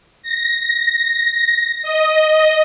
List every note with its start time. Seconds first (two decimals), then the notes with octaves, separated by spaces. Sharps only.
0.23 A#6
1.82 D#5